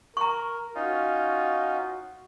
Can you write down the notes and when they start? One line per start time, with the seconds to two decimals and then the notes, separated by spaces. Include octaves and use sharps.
0.17 A#4 A#5 C#6
0.75 C#4 D#4 F4 F#4